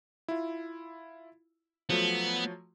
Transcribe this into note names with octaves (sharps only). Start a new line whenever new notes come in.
E4 F4
F3 F#3 A3 B3